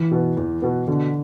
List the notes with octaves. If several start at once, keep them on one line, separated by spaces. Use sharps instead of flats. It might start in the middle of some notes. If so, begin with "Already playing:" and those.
Already playing: E3
B2 B3
E2
B2 B3
B2 D3